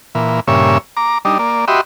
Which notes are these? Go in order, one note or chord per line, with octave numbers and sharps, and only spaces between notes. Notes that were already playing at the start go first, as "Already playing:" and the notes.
A#2 E3
G2 A#2 C#3 C#5 E5
A#5 D6
G3 D4 D#4
A#3 D5
F#4 G4 D#5 E5 B5 C6